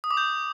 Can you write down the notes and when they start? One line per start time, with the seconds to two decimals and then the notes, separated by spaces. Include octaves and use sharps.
0.04 D#6
0.11 D6
0.17 G6